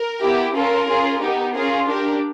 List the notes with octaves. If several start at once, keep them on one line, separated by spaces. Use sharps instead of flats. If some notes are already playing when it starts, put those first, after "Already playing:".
Already playing: A#4
B3 E4 G4
C#4 F4 A4 A#4
C#4 F4 G#4
B3 D#4 G4
C#4 F4 G#4 A#4
D4 G4 A#4